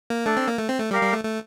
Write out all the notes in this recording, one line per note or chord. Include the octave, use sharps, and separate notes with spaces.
A#3
A3 D4 A4 D5
C4
A#3
A3
C4
A3
G3 G4 A#4 F5
G3
A3
A3